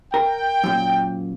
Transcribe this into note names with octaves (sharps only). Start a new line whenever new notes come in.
A#4 G5
F#2 A#2